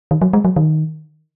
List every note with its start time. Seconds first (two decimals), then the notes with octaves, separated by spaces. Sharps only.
0.11 D#3
0.22 F#3
0.33 G#3
0.45 F#3
0.56 D#3